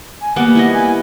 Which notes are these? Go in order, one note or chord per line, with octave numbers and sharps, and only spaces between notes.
G#5
G3 A#3 B3 F#5
E4 B4 D#5
G#5